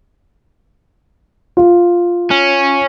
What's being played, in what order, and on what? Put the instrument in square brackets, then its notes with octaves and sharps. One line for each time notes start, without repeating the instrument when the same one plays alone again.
[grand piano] F4
[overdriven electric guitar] C#4